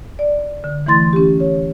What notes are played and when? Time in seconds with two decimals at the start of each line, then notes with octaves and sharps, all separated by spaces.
0.19 D5
0.64 D3
0.86 E3 A3 E4 C6 A6
1.13 C#4 G4
1.40 C#5